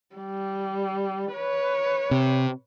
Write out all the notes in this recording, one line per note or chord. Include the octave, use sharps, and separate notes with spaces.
G3
B4 C#5
C3